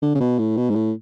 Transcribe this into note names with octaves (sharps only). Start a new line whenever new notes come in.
D3
C#3
B2
A2
B2
G#2
A2